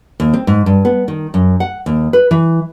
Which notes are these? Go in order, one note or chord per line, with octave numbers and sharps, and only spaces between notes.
D#2
C4
G#2
G2
B3
D#3
F#2
F#5
D#2
B4
E3